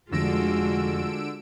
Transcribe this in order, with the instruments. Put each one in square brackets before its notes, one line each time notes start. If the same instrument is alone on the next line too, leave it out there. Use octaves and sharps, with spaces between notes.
[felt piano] F1 A#6 [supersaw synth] D3 E6 D7 [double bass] G#3 [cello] F4 F#4